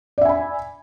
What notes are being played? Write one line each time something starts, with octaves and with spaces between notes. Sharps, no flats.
D5 E5 G#5 B5